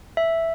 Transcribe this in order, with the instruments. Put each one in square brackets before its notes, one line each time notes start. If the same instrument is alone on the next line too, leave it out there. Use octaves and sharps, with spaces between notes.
[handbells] E5